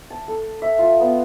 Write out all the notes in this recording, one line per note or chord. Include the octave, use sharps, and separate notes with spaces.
A5
A4
E5
F4
B3